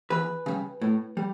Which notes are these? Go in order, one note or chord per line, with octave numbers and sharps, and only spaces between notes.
E2 B4
C#3 G3
A2
G3